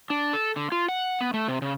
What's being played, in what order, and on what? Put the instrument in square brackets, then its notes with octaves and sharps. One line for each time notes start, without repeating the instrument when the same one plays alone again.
[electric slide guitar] D4
A4
D3
F4
F#5
B3
A3
C3
C#3